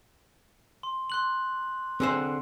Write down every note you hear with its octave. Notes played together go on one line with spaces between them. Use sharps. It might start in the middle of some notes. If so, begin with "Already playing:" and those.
C6
C6 F#6 F#7
D3 C4 G#4 C5